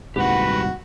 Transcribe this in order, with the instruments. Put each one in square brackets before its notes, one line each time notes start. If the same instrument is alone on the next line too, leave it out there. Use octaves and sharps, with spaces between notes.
[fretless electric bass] D#1 C2 G#2 [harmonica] F#4 [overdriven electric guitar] G4 F#5 [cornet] B4